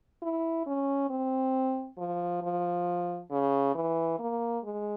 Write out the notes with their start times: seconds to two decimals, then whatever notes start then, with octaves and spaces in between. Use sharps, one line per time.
0.22 E4
0.66 C#4
1.10 C4
1.98 F3
2.42 F3
3.31 C#3
3.74 E3
4.19 A#3
4.63 G#3